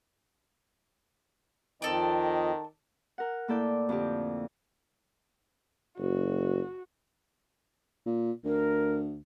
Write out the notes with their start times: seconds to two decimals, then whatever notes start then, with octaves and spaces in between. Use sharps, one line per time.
1.82 F2 D#3 C4 A4 D5 D#5
3.18 A#4 F#5
3.48 A2 A#3 E4 A4 D5 G6
3.89 F2 D3 G4
5.98 F#1 F#4
8.06 A#2
8.45 D2 A#4